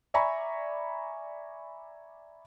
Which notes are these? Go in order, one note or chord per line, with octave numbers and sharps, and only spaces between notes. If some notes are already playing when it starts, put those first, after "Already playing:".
D5 E5 G#5 A#5 B5 C#6